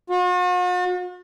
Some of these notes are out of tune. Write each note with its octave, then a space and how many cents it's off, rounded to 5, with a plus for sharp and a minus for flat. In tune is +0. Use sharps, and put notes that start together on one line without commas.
F#4 -45